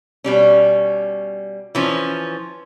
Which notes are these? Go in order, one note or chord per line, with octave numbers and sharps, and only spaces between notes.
B2 G3 C#4
E3 F3 C#4